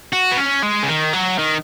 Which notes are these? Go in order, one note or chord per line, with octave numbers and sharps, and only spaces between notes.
F#4
B3
C#4
G#3
C#3
D#3
F#3
D#3